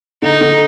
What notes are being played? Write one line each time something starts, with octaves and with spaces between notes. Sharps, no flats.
D3 D#4
D3